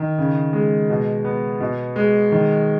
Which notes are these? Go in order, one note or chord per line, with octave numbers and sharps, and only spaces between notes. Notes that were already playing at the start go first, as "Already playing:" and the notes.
Already playing: D#3
C#3
G#3
B2
B3
B2
G#3
D#3